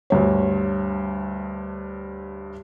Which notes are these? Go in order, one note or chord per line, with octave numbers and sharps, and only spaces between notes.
D2 G2 C#5